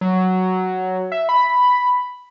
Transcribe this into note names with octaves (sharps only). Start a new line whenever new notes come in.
F#3
E5
B5